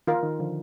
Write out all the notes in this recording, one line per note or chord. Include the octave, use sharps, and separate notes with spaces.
D#3 F4 A#4 F5
D#3
D3 F3